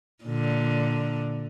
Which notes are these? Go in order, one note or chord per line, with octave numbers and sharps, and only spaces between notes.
A#2 D3